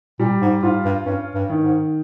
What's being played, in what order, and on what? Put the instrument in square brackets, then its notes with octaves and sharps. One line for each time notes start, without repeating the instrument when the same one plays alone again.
[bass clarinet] A#2 [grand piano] G3
[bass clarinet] G#2
[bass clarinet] G#2 [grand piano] F4
[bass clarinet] G2
[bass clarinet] G2 [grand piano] C#4
[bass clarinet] G2
[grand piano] D#3
[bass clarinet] G#2